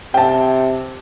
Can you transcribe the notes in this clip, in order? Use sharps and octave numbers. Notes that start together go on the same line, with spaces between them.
C3 G5 A5